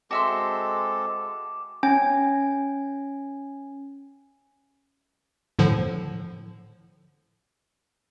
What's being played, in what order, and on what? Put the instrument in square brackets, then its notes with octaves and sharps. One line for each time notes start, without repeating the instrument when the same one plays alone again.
[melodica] G#3 C4 A4 [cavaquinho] F#4 E5 C6 [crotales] D6
[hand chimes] C#4 G#5
[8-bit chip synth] A2 D3 F3